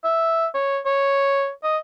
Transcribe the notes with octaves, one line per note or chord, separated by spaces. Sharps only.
E5
C#5
C#5
D#5